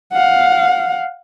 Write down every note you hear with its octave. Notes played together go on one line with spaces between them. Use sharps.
F5 F#5